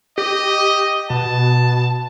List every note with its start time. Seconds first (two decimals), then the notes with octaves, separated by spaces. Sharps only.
0.18 G4 D#5
1.10 B2 A5